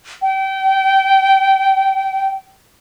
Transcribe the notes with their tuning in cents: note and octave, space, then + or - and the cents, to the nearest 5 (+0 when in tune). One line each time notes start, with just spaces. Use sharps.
G5 -25